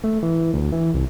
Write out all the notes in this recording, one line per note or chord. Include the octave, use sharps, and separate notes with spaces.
A3
E3
D2
E3
C2